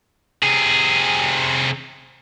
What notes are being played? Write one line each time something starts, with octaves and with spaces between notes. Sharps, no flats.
C3 G#4